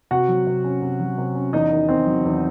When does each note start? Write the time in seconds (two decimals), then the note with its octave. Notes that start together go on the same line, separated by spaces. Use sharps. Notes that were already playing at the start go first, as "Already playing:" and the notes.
0.11 C3 F#4 F#5
0.28 F#3
0.47 C3
0.64 C#4
0.82 C3
1.00 F#3
1.18 C3
1.35 C#4
1.53 E2 D#4 D#5
1.71 D#3
1.88 C4
2.07 F#3
2.25 E2